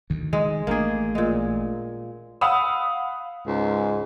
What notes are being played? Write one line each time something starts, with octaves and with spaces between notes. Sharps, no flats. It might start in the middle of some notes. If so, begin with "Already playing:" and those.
D2 D#3
D#3 G#3
A1 A3 A#3 D4 G#4
A#2 G#3
F5 F#5 B5 D#6 E6
C#2 G#2